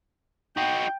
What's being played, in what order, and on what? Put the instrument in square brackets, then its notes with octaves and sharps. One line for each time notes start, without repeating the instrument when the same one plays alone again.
[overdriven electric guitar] D#4 F#4 [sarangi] G5